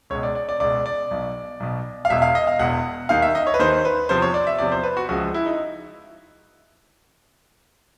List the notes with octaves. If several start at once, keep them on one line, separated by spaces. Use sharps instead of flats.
C#2 B2 C#5
D5
D5
D5
C#2 B2 D5
D5
B1 B2
B1 B2
F5
E1 E2 B2 E5
F5
D#5
F5
E1 E2 B2 F#5
D#2 D#3 F5
E5
D#5
C#5
B4
D#2 D#3 C5
B4
E2 C3 F3 C5
C#5
D5
E5
E2 C3 F3 D5
C5
B4
F#4
C#2 C#3 F3 F#4
E4
D#4